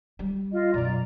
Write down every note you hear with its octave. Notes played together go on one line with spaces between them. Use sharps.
G3
F4 D#5
F#2 B2 D5 A#5